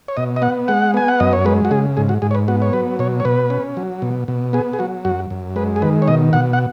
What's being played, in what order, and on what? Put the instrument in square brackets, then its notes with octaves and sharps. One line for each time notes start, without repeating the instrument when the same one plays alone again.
[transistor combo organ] C#5
B2 D#5
D#5
B3 F#5
G#3 F#5
B3 G#5
F#5
F#2 D#5
C#5
G#3 B4
F#4
C#3 G#4
G#2 G#4
F#4
G#2 G#4
C#5
B4
B3 F#4
C#5
F#3 B4
B2 C#5
C#5
B2 B4
C#4
F#3
B2
B2
B3 G#4
G#4
F#3 F#4
F#2 F#4
F#2
G#3 B4
G#4
D#3 B4
C#5
B2 D#5
B2 F#5
F#5